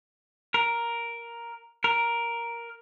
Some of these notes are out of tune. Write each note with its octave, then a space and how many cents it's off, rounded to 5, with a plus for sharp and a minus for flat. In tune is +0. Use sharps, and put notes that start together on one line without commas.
A#4 +5
A#4 +5